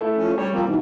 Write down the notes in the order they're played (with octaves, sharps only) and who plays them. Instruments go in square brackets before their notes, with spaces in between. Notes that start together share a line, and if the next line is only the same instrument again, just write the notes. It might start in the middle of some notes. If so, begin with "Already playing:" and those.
[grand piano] A3 E4
[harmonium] F3 C#4
[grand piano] G3 [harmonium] C#5
[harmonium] F3 A#3 C4
G#2 B2 E3